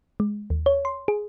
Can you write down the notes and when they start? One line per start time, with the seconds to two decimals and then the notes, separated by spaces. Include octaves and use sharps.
0.20 G#3
0.50 D#2
0.66 C#5
0.85 C6
1.08 G#4